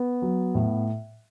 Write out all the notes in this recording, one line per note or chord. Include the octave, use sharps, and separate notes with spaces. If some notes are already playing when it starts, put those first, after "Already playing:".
Already playing: B3
F#3
A2